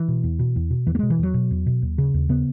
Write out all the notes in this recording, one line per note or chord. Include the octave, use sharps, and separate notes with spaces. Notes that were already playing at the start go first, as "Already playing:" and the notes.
Already playing: E3
B2
E2
B2
E2
B2
E2 E3
A#3
B2 G#3
E3
E2 F#3
B2
E2
B2
D#2
C#3
D#2
C#3 B3